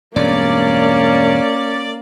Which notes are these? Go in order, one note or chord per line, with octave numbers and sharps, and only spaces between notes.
E1 G2 A#3 C#4 D5